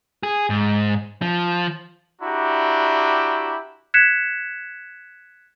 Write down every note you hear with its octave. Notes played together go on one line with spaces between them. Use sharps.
G#4
G#2
F3
D4 E4 F#4 G4 A#5
F#6 G#6 B6 C#7 E7